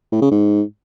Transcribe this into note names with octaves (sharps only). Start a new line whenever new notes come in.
A2
C#3
G#2